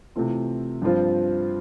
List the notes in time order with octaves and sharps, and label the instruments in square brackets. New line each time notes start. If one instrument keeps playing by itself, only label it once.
[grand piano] C3 E3 A3 C4 F4
G2 F3 C4 F4